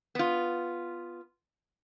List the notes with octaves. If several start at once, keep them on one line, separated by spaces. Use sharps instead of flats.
B3 F4